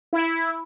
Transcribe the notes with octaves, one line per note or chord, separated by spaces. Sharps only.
E4